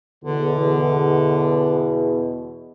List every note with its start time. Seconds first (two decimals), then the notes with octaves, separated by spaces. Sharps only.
0.24 E2 B2 D3